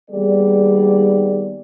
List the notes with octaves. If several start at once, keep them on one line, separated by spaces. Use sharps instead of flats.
D#3 G3 A#3 B3 G#4 D5